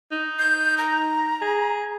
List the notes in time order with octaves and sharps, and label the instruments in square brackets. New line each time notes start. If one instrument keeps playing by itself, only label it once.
[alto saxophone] D#4
[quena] G6
A#5
[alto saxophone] G#4